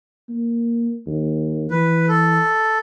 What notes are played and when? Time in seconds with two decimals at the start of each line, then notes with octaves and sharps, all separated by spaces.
0.29 A#3
1.07 D#2
1.70 E3 B4
2.08 A4